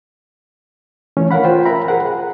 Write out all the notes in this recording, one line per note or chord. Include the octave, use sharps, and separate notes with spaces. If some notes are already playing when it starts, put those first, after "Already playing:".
E3 A3 C#4
A#4 C#5 F5 F#5 B5
F4 C5 G5
A#4 E5 A#5 B5
G#4 A#4 F#5
F#5